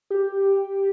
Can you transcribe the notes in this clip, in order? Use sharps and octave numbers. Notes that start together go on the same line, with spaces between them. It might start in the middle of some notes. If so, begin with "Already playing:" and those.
G4